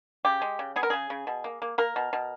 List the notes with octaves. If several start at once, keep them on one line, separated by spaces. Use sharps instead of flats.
C#3 G4
G#3
C#3
B3 G#4
A#4
C#3 G#4
C#3
B2
A#3
A#3
A#3 A#4
B2
B2